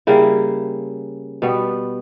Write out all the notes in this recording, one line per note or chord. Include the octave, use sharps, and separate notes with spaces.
C#3 G3 A#3 E4
B2 G3 B3